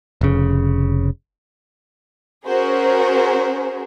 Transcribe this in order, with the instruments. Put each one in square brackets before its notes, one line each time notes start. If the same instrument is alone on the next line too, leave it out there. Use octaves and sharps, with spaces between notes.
[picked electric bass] F1 C#3
[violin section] C#4 F#4 G#4 A#4 C5